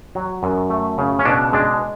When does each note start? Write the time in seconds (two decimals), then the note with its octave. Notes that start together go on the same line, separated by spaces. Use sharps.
0.15 F#3
0.43 F#2
0.70 A3
0.98 C#3
1.19 C#4
1.25 B2 D4
1.53 G#3 D4